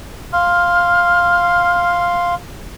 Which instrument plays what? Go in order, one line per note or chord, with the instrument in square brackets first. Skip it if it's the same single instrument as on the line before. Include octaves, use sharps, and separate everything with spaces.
[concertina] F5 C6 [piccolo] F6